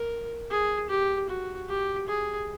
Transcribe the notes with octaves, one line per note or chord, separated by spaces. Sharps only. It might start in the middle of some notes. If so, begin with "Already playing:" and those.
Already playing: A#4
G#4
G4
F#4
G4
G#4